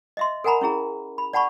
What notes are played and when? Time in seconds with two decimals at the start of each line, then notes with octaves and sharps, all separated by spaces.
0.17 D#5 E5 C6
0.44 A4 A#4 F#5 G#5 A#5 B5
0.61 C#4 E4 G#4 A#5
1.18 B5
1.33 D5 F#5 A5 B5 C#6